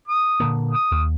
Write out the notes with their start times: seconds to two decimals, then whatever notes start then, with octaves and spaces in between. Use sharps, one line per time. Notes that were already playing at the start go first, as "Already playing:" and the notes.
0.08 D#6
0.40 A#2 D3 A#3
0.71 D#6
0.92 D#2